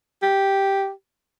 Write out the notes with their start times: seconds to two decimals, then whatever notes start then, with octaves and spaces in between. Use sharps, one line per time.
0.22 G4